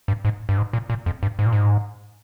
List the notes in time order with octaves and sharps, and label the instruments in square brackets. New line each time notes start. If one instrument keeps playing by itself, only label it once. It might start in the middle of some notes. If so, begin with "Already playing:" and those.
[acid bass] G2
G#2
G2
G#2
A#2
A#2
F2
G2
G#2
A#2
G#2